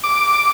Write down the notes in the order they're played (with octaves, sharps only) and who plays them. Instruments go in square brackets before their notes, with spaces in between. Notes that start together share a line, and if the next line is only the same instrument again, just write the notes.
[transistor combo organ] D6